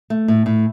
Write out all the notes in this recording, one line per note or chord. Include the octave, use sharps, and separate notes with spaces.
A3
A2
A2